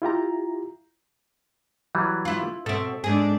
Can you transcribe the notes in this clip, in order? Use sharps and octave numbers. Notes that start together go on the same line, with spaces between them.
E4 F4 G4 A#5
E3 F#3 G3
E4 F4
B2 C4 A4 E5
G#2 C4 D4 G#4